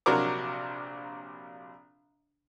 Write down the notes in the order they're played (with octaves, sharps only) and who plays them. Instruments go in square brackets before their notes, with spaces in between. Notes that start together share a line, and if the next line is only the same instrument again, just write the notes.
[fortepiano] A#1 C3 F#3 D4 A#4 D6